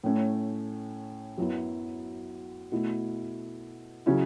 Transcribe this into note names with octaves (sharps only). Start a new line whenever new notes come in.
A2 A3 C#4
F#2 F#3 B3 E4
B2 A3 E4
C#3 F#3 C#4 E4